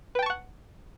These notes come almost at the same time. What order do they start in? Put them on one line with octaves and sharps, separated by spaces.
B4 G5 A5 C#6 F#5